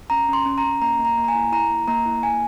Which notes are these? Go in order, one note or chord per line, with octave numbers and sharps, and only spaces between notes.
C#4 A#5
C#4 C6
C#4
A#5
C#4
A#3 A#5
A#3
A#5
A#3
A#5
G#5
E4
E4 A#5
A#3
A#3 A#5
E4
A#3 G#5